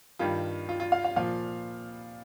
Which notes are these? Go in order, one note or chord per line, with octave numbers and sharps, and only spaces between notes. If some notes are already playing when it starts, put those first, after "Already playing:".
G2 D#3 G3 F4
F4
F4
F5
F5
A#2 F3 F5